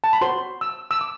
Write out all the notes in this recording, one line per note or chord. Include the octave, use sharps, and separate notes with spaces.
A5
B5
F#4 C5 C6
E6
E6
D6